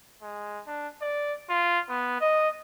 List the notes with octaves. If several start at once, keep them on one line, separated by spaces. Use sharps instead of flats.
G#3
D4
D5
F4
B3
D#5